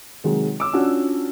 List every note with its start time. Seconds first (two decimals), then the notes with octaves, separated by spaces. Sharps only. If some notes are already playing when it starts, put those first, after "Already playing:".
0.24 C3 D#3 F#3 G#3
0.60 D6 E6
0.73 C#4 D4 F4 F#4